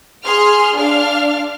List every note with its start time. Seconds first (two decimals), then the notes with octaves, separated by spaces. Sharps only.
0.24 G#4 C6 F6
0.76 D4 F5 F6